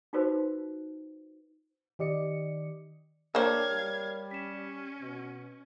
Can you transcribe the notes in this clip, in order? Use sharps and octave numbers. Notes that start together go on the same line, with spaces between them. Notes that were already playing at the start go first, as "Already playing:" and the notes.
D#4 F4 F#4 B4 C5
D#3 G4 D5 D#5 C#7
A#3 D4 A#4 C5 C#5 F5 G5 G#6
G3
C#4 B6 E7
B2